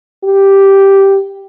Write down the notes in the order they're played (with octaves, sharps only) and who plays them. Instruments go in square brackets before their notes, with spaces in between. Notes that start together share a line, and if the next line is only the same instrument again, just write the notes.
[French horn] G4